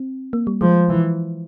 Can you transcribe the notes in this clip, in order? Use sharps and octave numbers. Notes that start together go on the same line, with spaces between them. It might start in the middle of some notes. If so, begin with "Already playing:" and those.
Already playing: C4
A#3
G3
F3 G#3
E3